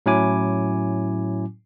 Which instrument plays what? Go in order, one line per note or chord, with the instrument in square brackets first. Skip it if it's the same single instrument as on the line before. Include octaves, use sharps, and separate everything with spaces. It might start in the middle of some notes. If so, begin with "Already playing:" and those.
[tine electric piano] A2 F#3 C#4 E4 G#5 D6